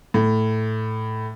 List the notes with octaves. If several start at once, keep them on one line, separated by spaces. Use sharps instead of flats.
A2